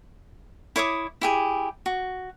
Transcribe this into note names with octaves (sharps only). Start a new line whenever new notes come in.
E4 C#5 D6 D#6
E4 G4 G#4
F#4